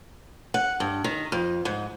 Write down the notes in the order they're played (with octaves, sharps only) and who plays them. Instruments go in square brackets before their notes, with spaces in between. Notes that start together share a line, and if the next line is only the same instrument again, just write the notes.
[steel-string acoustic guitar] F#5
G2
D#3
F2
G#2